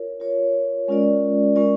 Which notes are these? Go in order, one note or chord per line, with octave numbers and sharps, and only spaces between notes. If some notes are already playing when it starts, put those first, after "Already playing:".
Already playing: F4 A#4 C#5
F4 A#4 C#5
G#3 C#4 F4 A#4 D5
G#3 C#4 F4 A#4 D5